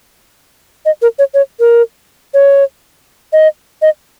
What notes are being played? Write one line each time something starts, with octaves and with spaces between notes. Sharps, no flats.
D#5
A#4
C#5
C#5
A#4
C#5
D#5
D#5